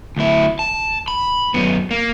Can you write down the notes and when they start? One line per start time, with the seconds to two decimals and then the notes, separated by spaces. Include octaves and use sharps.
0.17 D2 E4
0.59 A5
1.08 B5
1.54 F#2 B3
1.91 A#3